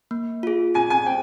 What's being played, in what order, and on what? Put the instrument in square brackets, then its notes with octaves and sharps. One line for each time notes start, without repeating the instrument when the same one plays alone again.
[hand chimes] A#3
F4 G#4
[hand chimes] G#4 [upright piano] G#5
[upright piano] G#5
[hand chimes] C5 [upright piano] G5